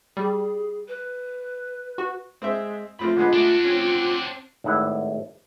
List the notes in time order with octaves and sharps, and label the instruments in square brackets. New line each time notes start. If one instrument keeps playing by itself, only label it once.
[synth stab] G3 [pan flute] G#4
[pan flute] B4
[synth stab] F#4
[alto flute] G#3 [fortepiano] C4 C5 E5
[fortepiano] F3 C4 B5 [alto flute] A3 [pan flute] F4
[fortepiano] D3 G#3 B3 [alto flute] D#5
[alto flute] A3 [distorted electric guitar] D4 F#4
[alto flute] C4 [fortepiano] C#4
[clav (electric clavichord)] G#1 A2 E4 F#5